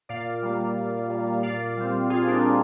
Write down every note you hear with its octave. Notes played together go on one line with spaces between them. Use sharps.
A#2 D5 F5
G3 A#3
A#2
G3 A#3
A#2 D5 F5
G3 C4
A#2 F4 G#4
D4
D#4
G3 C4